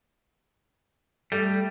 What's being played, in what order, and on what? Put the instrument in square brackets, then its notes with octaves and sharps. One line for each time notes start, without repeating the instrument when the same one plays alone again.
[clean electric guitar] G3 [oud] A3